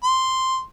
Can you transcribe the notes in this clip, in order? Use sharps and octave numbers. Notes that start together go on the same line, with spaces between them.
C6